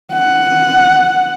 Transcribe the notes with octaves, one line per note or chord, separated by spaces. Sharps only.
F#5